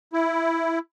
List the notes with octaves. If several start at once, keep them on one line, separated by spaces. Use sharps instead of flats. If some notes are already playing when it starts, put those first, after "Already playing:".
E4